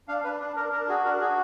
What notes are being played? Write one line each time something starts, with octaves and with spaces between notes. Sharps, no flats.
D4 F5
D4 B4
D4
D4 A#4
D4 A#4
F#4 G#4
D4 A#4
F#4 G#4